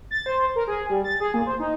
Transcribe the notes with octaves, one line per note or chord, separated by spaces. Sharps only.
A6
C5
A#4
G#4
G3
A6
G#4
A#2
C5
D#4